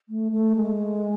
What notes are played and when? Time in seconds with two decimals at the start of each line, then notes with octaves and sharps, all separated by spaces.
0.09 A3
0.32 A3
0.56 G#3